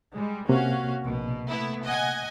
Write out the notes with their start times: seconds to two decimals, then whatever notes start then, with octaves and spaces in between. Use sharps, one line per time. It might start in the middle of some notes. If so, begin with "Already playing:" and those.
0.14 G3 G#3
0.49 C3 A#3 C#4 F#4 F5
1.02 A#1 B2
1.48 A3 B3 E4
1.85 D#5 F#5 G#5